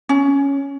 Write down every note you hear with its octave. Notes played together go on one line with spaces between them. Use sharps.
C#4